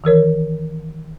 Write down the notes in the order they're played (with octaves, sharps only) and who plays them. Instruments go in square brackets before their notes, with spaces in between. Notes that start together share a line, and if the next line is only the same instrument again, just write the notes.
[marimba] D#3 E3 A#4 C#5